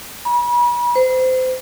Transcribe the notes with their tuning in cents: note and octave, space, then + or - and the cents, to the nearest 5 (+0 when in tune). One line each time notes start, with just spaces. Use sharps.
B5 -40
C5 -25